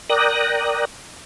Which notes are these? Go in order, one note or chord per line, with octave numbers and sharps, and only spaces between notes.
A#4 D5 G5 D#6 F#6 A#6